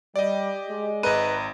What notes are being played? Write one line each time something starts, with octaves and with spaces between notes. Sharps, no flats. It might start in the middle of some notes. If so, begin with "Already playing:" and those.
G3 G4 D5 D#5
G#3
G#1 B4 D#5 A#5 D#7